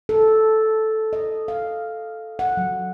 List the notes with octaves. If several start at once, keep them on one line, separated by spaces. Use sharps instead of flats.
A4
D#5
F5
F#5
F#3